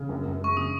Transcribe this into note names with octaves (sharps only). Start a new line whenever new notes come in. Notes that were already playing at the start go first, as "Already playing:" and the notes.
Already playing: C#3
F#2
F#2
G#3 C#6
C#3 D#6